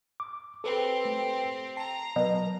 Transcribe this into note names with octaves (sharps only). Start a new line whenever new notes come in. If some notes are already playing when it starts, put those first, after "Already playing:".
D6
C4 G4 A4 B4
A3
A5 A#5 C7
B2 F#3 B3 A#4